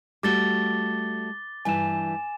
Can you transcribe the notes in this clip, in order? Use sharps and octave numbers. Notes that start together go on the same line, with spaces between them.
G3 A3 F#4 D6 A6 G7
G2 E3 G#5 E7